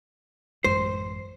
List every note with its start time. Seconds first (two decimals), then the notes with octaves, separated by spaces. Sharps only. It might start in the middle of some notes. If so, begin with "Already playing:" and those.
0.64 A1 F#2 G#3 C5